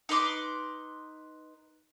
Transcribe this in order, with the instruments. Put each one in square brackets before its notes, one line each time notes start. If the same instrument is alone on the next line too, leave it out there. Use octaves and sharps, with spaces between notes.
[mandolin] D#4 B4 C6 D6